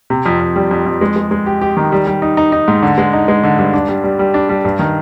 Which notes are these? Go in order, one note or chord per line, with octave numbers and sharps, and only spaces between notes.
C3
F2
F2
G3
F2
F2
G#3
G#3
G#3
G4
G4
D#3
G3
G3
D#4
D#4
D#4
G#2
D3
G#3
D#4
G#3
D3
G2
D4
G3
G3
G3
D4
G3
G2
D#3